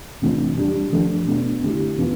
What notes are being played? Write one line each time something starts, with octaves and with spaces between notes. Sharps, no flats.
C3 E3 A3 D4 F4
G3 D4 G4
F3 A3 D4 A4
B2 A3 D4
D3 A3 E4 G4
E3 B3 F4